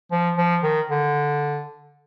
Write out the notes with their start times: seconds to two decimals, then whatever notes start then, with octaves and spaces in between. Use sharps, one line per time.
0.12 F3
0.37 F3
0.63 D#3
0.90 D3